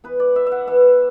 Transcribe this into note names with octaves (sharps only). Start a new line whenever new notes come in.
E3 B3 B4
D5
E5
E5
F#5
E3 B3 E5